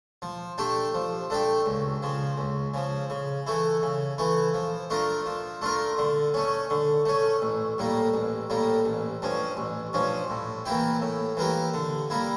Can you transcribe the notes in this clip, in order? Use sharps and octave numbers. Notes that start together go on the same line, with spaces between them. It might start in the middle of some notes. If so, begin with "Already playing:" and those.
F3
A3 D4 G4
F3
A3 D4 G4
C#2
C#3 F3
C#2
C#3 F3
C#3
E3 A3 E4
C#3
E3 A3 E4
F3
A3 D4 F4 A#4
F3
A3 D4 F4 A#4
D3
A3 C#4
D3
A3 C#4
A1
A2 G3 A#3
A1
A2 G3 A#3
A1
G2 F3 C#4
A1
G2 F3 C#4
A2
E3 A#3 E4 G4
A2
E3 A#3 E4 G4
D3
G3 A#3 E4